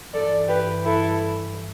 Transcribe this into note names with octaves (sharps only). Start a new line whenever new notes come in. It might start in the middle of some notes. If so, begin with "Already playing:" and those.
G2 E3 A4 D5
G4 B4
E4 A4